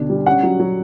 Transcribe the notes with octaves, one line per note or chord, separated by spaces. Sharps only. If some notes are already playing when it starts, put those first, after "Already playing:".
Already playing: D2 B2 D4
G3
C#4 F#5
F#3
F#3